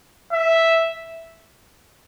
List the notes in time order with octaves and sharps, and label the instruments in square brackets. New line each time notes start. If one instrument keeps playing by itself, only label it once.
[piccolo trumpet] E5